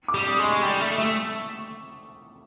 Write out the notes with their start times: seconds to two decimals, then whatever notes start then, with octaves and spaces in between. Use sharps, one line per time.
0.08 D6
0.14 G3
0.27 D#6
0.39 G#3
0.44 C#6
0.63 G3
0.80 A3
0.99 A3